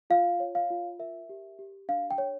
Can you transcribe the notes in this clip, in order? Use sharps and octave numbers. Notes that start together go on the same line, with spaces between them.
F4 F5
C#5
F5
F4
A#4 E5
G4
G4
D4 F5
G5
C#5